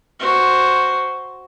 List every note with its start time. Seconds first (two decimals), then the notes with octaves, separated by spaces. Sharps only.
0.20 F#4 C5